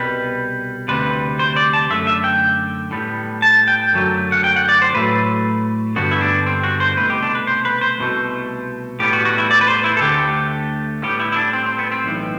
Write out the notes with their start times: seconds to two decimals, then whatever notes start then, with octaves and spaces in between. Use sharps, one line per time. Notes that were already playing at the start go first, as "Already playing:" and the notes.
Already playing: C2 B2 G3 B4
0.88 D2 C3 G3 B4
1.39 C5
1.56 D5
1.73 A5
1.90 F#2 D3 A3 E5
2.07 E5
2.24 G5
2.91 A2 G3 B3
3.42 A5
3.68 G5
3.93 F#2 D3 F#3 A3
4.32 F#5
4.44 G5
4.56 F#5
4.69 D5
4.82 C5
4.94 A2 F#3 A3 B4
5.96 G2 D3 G3 B3 F#4
6.11 E4
6.21 D4
6.46 C4
6.63 F#4
6.80 C5
6.97 C2 B2 A3 B4
7.10 G4
7.23 D4
7.35 B4
7.47 C5
7.65 B4
7.81 C5
7.98 C2 B2 A3
8.99 A2 G3 B3 G4
9.13 F#4
9.25 F#4
9.38 E4
9.51 D5
9.61 B4
9.68 C5
9.84 E4
9.97 A4
10.01 D2 D3 A3 G4
11.02 A2 G3 B3 G4
11.20 E4
11.32 E4
11.36 D4
11.53 C4
11.66 C4
11.79 B3
11.91 C4
12.04 B1 A2 E3